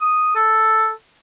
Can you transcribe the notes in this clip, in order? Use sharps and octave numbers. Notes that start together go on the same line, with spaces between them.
D#6
A4